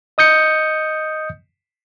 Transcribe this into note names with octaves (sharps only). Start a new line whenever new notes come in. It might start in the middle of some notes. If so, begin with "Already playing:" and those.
D#5 D#6 G6 C#7